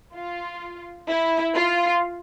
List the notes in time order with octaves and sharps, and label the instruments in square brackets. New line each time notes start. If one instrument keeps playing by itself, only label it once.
[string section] F4
E4
F4